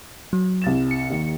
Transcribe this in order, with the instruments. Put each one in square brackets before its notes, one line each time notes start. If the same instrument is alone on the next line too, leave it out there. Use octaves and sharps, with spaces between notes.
[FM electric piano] F#3
[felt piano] C2 A6 E7
[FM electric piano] C#7
[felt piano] D#2 D#3